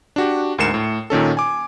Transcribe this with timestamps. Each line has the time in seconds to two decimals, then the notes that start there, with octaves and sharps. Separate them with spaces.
0.16 D4 F#4 G4
0.58 D2 G#2 A#4 C7 C#7 E7
0.74 A2
1.10 A#2 D#3 C#4 A4
1.37 G#5 D6